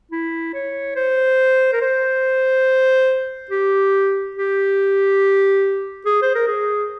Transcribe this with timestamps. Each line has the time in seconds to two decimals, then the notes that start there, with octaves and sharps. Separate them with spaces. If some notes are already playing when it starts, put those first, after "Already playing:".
0.11 E4
0.54 C#5
0.96 C5
1.73 A#4
1.81 C5
3.51 G4
4.35 G4
6.05 G#4
6.22 C5
6.35 A#4
6.47 G#4